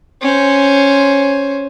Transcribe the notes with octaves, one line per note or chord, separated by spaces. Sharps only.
C#4 C5